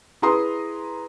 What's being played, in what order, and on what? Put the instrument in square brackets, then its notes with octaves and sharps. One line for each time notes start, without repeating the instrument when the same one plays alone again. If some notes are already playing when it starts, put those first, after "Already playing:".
[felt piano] E4 G#4 B4 A#5 C6 D#6